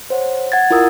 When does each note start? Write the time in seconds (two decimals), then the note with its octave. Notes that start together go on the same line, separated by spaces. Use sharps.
0.10 C5 C#5 F#5
0.52 F#5 G#6 A6
0.71 E4 F4 A#4 D#6 E6